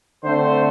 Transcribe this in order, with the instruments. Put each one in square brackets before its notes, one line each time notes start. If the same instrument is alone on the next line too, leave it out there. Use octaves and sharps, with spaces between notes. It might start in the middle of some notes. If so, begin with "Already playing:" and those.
[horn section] D3 A3 C4 C5